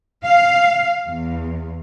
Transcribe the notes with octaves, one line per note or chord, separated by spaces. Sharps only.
F5
E2